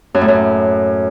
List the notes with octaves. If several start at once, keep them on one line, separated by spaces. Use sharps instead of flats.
F#2
A2
F#2